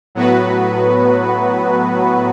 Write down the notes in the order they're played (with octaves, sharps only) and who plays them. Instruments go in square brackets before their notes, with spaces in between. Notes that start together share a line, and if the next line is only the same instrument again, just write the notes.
[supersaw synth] A2 F#3 B3 F#4 B4